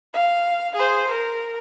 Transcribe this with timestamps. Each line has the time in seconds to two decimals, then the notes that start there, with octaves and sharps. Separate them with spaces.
0.14 F5
0.75 G#4 C5
1.08 A#4